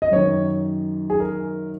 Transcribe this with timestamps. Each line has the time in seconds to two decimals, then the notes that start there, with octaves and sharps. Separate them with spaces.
0.02 D#5
0.12 F#2 D#3 C#5
1.10 G#4
1.20 A#4